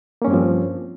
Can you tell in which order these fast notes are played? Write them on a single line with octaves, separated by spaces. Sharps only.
A#3 C#4 G2 C4 F3